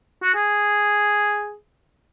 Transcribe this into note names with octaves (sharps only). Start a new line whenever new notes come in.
F#4
G#4